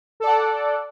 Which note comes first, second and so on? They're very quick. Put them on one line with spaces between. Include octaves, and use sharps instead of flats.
A4 D5 F#5